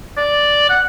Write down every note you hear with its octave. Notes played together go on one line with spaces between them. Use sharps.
D5
F#5